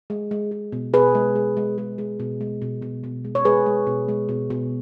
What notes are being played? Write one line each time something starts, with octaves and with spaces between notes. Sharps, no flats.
G#3
G#3
G#3
B2
B2 G#4 B4
G#3
G#3
G#3
G#3
G#3
B2
G#3
B2
B2
B2
G#3
C#5
G#3 G#4 B4
G#3
B2
G#3
B2
B2